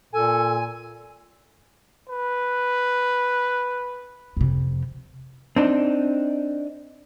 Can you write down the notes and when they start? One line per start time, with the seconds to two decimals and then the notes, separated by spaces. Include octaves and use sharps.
0.13 A#2 A4 G#5
2.09 B4
4.37 F2 C3
5.56 C4 D4 D#4